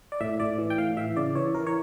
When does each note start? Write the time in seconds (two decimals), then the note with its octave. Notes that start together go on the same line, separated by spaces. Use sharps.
0.12 D5
0.21 A2 E5
0.40 A2 D5
0.58 E3
0.70 G5
0.78 A2 F5
0.97 E3 E5
1.17 C#3 D5
1.35 E3 C#5
1.55 E3 A#4
1.67 C#5